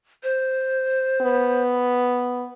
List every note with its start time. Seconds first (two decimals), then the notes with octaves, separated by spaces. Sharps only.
0.23 C5
1.22 B3